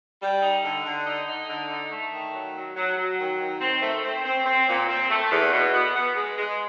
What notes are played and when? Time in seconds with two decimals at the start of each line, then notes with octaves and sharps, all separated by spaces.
0.22 G3
0.42 D#4
0.64 D3
0.85 D3
1.06 D#4
1.27 D#4
1.49 D3
1.71 D#4
1.92 A3
2.12 D#3
2.34 F#3
2.55 F#3
2.76 F#3
2.98 F#3
3.19 D#3
3.41 D#3
3.61 C4
3.82 A3
4.04 C4
4.25 C4
4.46 C4
4.68 A#2
4.89 C4
5.10 A3
5.32 E2
5.53 B2
5.74 B3
5.96 B3
6.16 G#3
6.38 G#3